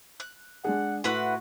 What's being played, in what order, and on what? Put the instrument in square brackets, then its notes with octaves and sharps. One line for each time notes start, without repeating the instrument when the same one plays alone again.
[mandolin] F#6
[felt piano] G#3 D4 G#4 [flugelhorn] F#5
[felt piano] A2 C6 [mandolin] E4 B4 F#5 [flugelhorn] F#4